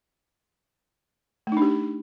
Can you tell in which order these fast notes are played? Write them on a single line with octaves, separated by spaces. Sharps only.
A3 D#4 D4 G4